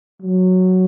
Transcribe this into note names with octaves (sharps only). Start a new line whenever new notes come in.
F#3